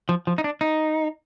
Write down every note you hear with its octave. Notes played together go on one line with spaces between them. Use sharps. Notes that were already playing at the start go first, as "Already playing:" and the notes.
F3
F3
D#4
D4
D#4